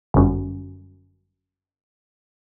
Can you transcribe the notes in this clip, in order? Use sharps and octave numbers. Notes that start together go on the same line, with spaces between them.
G1 F#2